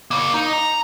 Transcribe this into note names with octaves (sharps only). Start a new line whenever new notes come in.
C#3 A#3
D#4
A#5